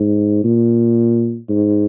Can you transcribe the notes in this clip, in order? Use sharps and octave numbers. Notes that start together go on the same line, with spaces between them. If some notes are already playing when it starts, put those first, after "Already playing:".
Already playing: G#2
A#2
G#2